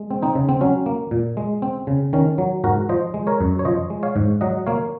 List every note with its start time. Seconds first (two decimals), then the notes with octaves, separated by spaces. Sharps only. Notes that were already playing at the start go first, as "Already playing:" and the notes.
Already playing: G#3
0.11 C4
0.23 C4 D#4
0.35 C#3
0.49 C4
0.61 F#3 C#4
0.86 A#3
1.11 A#2
1.37 G#3
1.62 C4
1.87 C#3
2.13 D#3 C#4
2.38 F#3
2.64 G#2 F#4 A#4
2.89 F3 C5 D#5
3.14 G#3
3.27 A#4 C#5
3.41 F#2
3.59 C#5
3.65 F3 C5 D#5
3.90 G#3
4.03 C#5 F5
4.16 G#2
4.41 F#3 D#5 F#5
4.66 A#3 C#5 F5